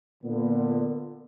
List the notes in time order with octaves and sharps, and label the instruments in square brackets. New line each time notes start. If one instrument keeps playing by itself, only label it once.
[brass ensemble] A#2 D3 B3